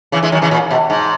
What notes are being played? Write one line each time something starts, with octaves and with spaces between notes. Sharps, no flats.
C#3 E3
E3 G#3
D#3 F#3
C#3 E3
A#2
B2
G#2